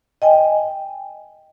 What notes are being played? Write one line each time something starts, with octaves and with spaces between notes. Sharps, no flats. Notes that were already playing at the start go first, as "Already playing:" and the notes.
D#5 G5 G#5